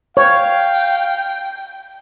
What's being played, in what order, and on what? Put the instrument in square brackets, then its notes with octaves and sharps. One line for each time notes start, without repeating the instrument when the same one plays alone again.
[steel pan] C#5 [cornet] F5 [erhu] G5